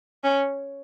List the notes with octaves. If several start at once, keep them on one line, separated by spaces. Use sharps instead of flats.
C#4